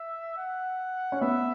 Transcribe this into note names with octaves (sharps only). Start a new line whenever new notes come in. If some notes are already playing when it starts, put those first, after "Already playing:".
Already playing: E5
F#5
C#4
B3 E5